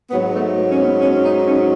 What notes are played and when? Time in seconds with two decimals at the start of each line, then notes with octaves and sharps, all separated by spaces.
0.10 G#2 F#3 B3
0.33 A3
0.70 C#4
0.78 B3
1.00 C#4
1.23 D#4
1.45 C#4